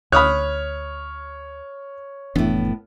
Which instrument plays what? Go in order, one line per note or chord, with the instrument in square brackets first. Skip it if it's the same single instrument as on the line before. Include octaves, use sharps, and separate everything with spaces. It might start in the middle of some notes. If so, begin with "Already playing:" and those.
[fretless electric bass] D2 [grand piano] C#5 F6 [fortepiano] B5 D#6 F#6
[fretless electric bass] F1 E3 D4 [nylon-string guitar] A2 B3